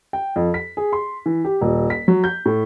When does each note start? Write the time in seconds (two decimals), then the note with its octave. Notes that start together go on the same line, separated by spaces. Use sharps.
0.13 G5
0.36 F2
0.54 B6
0.77 G#4
0.93 C6
1.26 E3
1.45 G4
1.61 D#1
1.90 B6
2.08 F#3
2.24 G6
2.46 A2